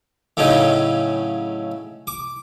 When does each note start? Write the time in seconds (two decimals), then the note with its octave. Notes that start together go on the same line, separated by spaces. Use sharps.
0.37 A2 C#3 F#3 C#4 D#4
2.07 D6